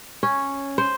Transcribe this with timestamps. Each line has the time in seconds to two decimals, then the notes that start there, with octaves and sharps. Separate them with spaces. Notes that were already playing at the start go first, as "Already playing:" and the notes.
0.23 C#4
0.78 C5